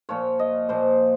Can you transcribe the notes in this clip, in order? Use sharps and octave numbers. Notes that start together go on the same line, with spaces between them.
A#2 F3 C#5
D#5
A#2 F3 C5